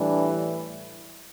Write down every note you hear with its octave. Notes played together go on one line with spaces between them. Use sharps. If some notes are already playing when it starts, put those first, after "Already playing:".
Already playing: A2 E3 G3 D4